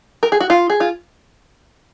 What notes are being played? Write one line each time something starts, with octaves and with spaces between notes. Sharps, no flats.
A#4
G#4
F#4
F4
G#4
F4